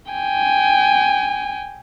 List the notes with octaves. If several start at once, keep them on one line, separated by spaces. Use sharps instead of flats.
G5 G#5